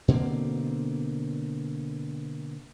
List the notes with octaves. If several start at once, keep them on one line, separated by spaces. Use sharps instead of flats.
B2 D3 A#3 C4